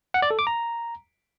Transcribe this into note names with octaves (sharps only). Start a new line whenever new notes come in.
F#5
D5
A4
D6
A#5